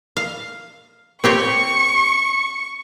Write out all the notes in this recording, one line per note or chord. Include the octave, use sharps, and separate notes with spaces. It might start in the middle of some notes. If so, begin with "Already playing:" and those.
F5
C4 G4 C#5 C#6